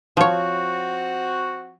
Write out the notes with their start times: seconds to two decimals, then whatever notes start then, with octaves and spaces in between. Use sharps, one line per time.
0.17 F3 C4 F#4 C#5